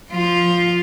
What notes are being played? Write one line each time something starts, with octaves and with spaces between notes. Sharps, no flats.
F3 F4